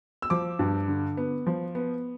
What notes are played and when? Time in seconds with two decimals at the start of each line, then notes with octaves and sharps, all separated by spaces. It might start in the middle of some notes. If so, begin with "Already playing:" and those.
0.22 E6
0.30 F3 D6
0.59 G2
0.88 D3
1.17 B3
1.47 F3
1.75 B3